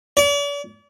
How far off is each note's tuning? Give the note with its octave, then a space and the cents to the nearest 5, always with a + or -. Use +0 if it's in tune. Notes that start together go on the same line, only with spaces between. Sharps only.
D5 -45